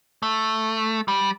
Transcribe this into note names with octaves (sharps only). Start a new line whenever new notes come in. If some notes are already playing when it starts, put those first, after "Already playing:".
A3
G3